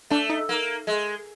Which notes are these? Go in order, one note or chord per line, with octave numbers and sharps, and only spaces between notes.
A3 D4
D#4
A#3
G#3